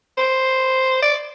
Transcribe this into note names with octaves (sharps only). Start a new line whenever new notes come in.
C5
D5